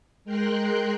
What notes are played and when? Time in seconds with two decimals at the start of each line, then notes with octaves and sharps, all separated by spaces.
0.25 G#3 A#4 G5 A#5 C6 F#6